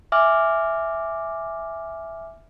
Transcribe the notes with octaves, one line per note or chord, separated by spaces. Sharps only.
E5 G#5 D6 F6